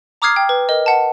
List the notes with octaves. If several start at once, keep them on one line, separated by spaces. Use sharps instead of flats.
A#5 D6 D#6 F6 G#6 C7
G5
B4
A#4 D#5
F#5 A5